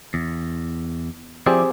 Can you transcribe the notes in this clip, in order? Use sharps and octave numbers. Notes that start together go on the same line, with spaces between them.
E2
F3 C4 E4 G4 G#4 D5